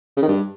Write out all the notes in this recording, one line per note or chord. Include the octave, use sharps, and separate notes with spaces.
C#3
D#3
G2